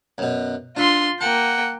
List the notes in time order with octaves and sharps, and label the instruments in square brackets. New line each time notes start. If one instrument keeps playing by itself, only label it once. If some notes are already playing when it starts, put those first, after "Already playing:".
[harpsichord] F#2 B2
[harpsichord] D4 E5 [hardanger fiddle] F4 C6
[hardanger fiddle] A#3 G5 [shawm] F#5 [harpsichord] A5